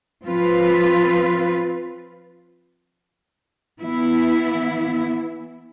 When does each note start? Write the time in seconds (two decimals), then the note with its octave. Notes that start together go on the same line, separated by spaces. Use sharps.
0.24 F3 C4 F4 B4
3.81 E3 B3 E4